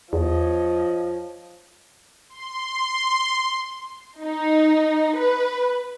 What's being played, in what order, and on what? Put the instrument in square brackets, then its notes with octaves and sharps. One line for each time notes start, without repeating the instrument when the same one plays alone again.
[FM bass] E2 [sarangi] F3 [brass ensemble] C#5 D#5
[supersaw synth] C6
[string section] D#4
B4